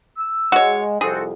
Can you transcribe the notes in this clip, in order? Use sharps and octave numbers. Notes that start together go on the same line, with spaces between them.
E6
G#3 F#4 C#5 F#5
C2 F2 C4 F#4 G#4 A4